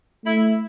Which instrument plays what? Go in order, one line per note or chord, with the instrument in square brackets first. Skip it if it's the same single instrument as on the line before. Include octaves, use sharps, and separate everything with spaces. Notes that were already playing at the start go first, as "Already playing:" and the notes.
[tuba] A3 [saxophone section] E4